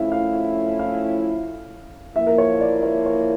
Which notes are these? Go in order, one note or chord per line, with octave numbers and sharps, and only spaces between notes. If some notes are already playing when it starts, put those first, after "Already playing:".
Already playing: F3 A3 C#4 E4 E5 F5
F5
F5
F3 A#3 E4 E5
A#4
C#5
D5
C#5
C#5